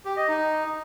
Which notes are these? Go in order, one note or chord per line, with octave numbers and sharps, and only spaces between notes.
G4
D#5
D#4